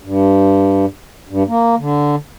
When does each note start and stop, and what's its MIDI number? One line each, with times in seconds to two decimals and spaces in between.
0.03 0.85 43
1.29 1.43 43
1.48 1.75 58
1.79 2.15 50